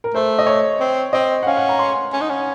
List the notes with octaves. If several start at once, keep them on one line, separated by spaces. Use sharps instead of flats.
A#4
A3 C5
D#5
C#5
C4
C4 D#5
F#5
C#4 F5
F#5
A#5
C6
C#4
D#4
C#4